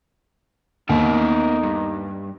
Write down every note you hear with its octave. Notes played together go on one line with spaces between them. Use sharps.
D#2 B3 D#4 A4 A#4
G2